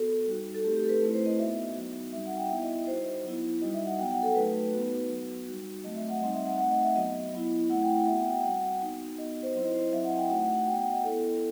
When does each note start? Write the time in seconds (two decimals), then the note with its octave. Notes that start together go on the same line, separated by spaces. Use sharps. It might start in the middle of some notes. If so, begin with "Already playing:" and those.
Already playing: B3 F#4 A4
0.27 G3 D#4 F#4
0.54 A4
0.64 A3 C4 D#4 G4
0.77 G4
0.85 A4
0.89 B4
1.02 A3 C4 E4
1.14 C5
1.26 D#5
1.38 B3 D#4 F#4 E5
1.75 F#3 B3 D#4 F#4
2.12 G3 C4 D#4 F#4 E5
2.26 F#5
2.37 G5
2.50 B3 E4 E5
2.63 D#5
2.87 G3 D#4 F#4 C5
3.24 F#3 B3 E4
3.62 G3 D#4 F#4 D#5
3.74 E5
3.85 F#5
3.99 F#3 B3 F#4 G5
4.11 F#5
4.23 A4
4.36 F#3 A3 D#4 F#4 B4
4.73 B3 D#4 F#4
5.09 F#3 B3 F#4
5.47 G3 D#4 F#4
5.84 F#3 A3 C4 F#4 D#5
5.96 E5
6.09 F#5
6.21 G3 C4 D#4 D#5
6.33 E5
6.45 F#5
6.58 A3 C4 D#4 F#5
6.71 D#5
6.83 E5
6.95 F#3 B3 F#4 D#5
7.33 F#3 B3 E4
7.69 A3 C4 E4 F#5
7.82 G5
7.99 F#5
8.07 B3 E5
8.10 F#4
8.19 G5
8.31 G5
8.44 G3 C4 F#4 F#5
8.81 B3 D#4 F#4
9.18 B3 D#4 F#4 D#5
9.43 C5
9.55 F#3 C4 E4 C5
9.64 D#5
9.73 C5
9.83 D#5
9.92 F#3 C4 E4 E5
10.05 F#5
10.17 G5
10.29 A3 D#4 F#4 F#5
10.55 F#5
10.67 B3 F#4 G5
10.79 F#5
10.92 D#5
11.04 B3 E4 A4